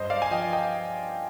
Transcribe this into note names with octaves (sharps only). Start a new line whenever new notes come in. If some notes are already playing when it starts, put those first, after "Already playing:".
Already playing: G2 C5 D#5
D5 F5
G#5
F3 D#5 G5
D#5 G5